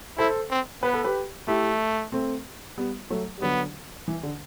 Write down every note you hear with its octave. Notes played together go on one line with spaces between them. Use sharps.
E4 A4 C5
C4
B3 B4
A4
G4 B4
A3 E4 G4
A3 C4
G3 B3
F#3 A3
G3
D3 F#3 B3
E3
D3